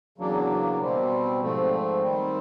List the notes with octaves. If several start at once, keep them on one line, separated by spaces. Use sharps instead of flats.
E2 C#3 F#3 A#3 D4
B2 G3 C4
G#2 F3 A3 C4
D#3 G3 C4